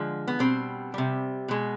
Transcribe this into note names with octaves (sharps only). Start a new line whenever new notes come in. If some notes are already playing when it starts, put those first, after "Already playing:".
Already playing: D3 F3 G#3
B3
B2 G3 C4
C3 G3
B2 G#3